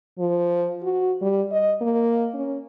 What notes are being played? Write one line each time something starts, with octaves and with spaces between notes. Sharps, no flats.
F3
F#4
G3
D#5
A#3
C#4